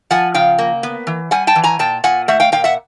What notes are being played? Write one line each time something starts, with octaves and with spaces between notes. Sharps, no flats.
F3 F#5 G#5
C#3 F5 G5
A#3
B3
E3
G3 F#5 G#5
G5 A5
E3
G#5 A#5
A#2 G5 A5
A#2 F#5 G#5
A3 E5 F#5
F5 G5
A#2 F5 G5
E5 F#5